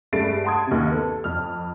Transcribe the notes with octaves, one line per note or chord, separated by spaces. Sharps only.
G2 G#3 A3 A6 C7 D7
F#5 A5 C6 D#6 G#6
D#2 C3
B3 A4
F2 F6